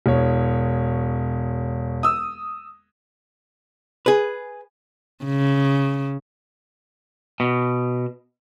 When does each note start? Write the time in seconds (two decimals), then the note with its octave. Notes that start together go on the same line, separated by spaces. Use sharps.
0.06 E1 C#5
2.03 D#6 E6
4.06 G#4 B4
5.25 C#3
7.40 B2